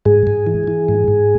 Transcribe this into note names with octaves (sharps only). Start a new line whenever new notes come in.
G#2 G#4
G#2
E3
E3
G#2
G#2